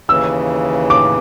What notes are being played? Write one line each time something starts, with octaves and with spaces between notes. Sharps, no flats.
D#2 C#3 E3 E6
D6